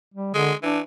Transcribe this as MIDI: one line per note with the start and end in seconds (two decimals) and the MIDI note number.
0.14 0.34 55
0.34 0.52 50
0.34 0.55 56
0.63 0.79 52
0.63 0.79 62